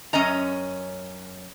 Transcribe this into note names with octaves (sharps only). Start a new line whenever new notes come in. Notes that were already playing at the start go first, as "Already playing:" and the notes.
F#2 C#4 C#5 D#5 A#5